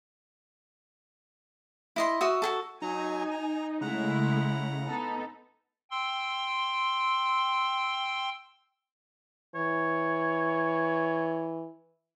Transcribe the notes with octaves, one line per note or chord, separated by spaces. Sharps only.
E4 D#5 C6
F#4 E5 D#6
F#4 G#4 A4
F#3 D#4 G#5 A#5
A#5
C#3 G#3 A3 E4 F#5 A#5
B3 D#4 A4
G5 C6 E6
E3 C#5